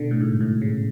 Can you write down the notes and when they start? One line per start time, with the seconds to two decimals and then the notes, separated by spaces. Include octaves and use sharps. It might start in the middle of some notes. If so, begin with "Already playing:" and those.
Already playing: B2 D3
0.11 A2
0.21 G#2
0.41 A2
0.62 C#3